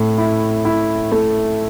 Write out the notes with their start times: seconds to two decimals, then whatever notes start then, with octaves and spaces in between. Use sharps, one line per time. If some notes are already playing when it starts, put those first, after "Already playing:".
Already playing: A2 A3
0.18 E4
0.65 E4
1.12 A3